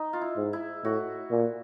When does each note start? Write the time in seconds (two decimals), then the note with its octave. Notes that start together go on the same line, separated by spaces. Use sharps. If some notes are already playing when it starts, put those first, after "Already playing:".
Already playing: D#4
0.13 F4
0.21 E4
0.37 G#2
0.53 E4
0.84 A2 F#4
1.31 A#2